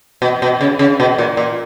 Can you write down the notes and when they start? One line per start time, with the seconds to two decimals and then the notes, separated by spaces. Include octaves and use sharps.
0.22 B2
0.42 B2
0.61 C#3
0.79 C#3
1.00 B2
1.18 A#2
1.37 A#2